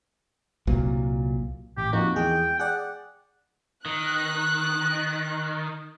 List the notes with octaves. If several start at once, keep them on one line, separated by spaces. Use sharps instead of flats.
C2 A#2 F#3
A1 G4
F2 A#3 D#4 F#4
E2 G#3 G#4 G5
G#4 D5 F#5 G5
D#3 F#6